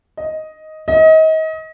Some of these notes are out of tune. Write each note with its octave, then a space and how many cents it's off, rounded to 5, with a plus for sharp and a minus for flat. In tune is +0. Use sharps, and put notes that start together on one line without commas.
D#5 +5
D#5 +30